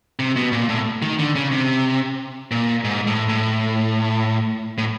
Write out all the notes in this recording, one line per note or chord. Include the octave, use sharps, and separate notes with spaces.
C3
B2
A#2
A2
D#3
D3
C#3
C3
A#2
G#2
A2
A2
A2